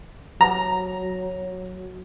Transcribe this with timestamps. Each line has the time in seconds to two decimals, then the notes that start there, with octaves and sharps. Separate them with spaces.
0.41 F#3 A#5